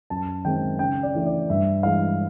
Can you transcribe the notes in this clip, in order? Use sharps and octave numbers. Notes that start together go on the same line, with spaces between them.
F#2 A5
D#3 G#3 C4 G5
C#3 G5
D5
E3 A3 D4
D5
G2 E5
E3 G#3 F5